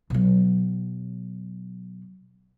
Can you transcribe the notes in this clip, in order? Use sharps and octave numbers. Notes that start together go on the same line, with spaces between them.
B2 F#3